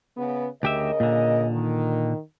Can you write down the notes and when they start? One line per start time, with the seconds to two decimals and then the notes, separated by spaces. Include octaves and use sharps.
0.17 C#3 B3
0.63 D2 C#3 G4 A#4 D#5 E5
1.00 A#2 D3
1.51 D#3